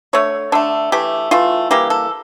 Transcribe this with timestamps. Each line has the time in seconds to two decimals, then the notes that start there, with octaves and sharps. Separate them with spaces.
0.13 D3 A3 C#5
0.52 D3 A3 A4
0.92 E3 A3 G4
1.31 E3 A3 F4
1.71 E3 G3 A#3 G4
1.90 A4